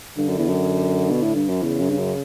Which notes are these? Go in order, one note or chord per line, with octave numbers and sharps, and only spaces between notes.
G2 D3
F#2
E2
F#2
B2
A2
G2
F#2
E2 C#3
F#2
G2
F#2